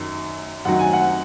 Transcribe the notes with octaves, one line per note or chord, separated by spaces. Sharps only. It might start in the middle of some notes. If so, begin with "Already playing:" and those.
Already playing: F#2 D#3 F#3
F#2 D#3 F#3 F#5
G#5
F#5